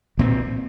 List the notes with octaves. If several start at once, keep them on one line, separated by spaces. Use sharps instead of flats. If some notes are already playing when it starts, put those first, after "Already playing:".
C2 A#2 F3 C4